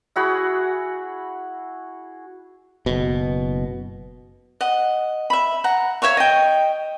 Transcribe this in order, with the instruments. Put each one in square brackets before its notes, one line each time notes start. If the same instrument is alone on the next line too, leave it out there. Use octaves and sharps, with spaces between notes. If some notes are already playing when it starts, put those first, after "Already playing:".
[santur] E4 F#4 G#4 B5
[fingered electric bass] F#1 B2
[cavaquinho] D#5 F#5
E5 B5
F#5 A#5
C#5 E5 F5 C#6
D#5 G5